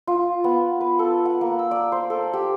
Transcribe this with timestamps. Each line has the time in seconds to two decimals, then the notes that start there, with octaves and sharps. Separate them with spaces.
0.07 F4
0.44 B3
0.81 B4
0.99 A4
1.25 F#5
1.41 A#3
1.59 E6
1.71 D5
1.92 C5
2.10 A4
2.33 G4